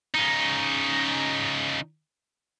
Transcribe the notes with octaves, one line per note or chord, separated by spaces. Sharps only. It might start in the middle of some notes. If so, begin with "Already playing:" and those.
C#3 D#4